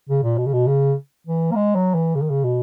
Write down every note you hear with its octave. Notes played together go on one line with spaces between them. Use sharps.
C#3
A#2
B2
C#3
B2
C#3
E3
A#3
G#3
F#3
E3
C#3
D#3
C#3
B2